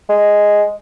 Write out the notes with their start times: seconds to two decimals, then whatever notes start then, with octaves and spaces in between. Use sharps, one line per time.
0.09 G#3